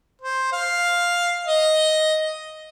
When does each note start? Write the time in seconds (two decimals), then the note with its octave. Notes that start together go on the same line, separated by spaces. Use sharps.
0.21 C5
0.52 F5
1.46 D#5